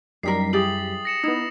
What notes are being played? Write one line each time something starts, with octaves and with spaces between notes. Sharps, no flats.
F#2 G3 D4 D#4 A#4 B6 C7
E4 G4 G#4 D#6 A6 F#7
A#6 C#7 E7
B3 D#4 E4 D#6